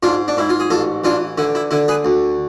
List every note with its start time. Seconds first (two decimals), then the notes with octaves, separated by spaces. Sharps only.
0.03 G#2 D4 F4
0.28 D4
0.37 G#2 E4
0.49 F4
0.60 G#4
0.70 A1 F4 A4
1.04 E3 D4 F4
1.38 D3 E4
1.55 E4
1.71 D3 E4
1.88 G#4 B4
2.05 D2